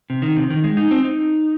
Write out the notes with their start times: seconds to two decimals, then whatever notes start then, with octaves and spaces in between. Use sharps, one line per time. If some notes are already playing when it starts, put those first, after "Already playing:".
0.10 C3
0.22 D#3
0.36 C3
0.50 D#3
0.64 G#3
0.77 D#4
0.91 C4
1.04 D#4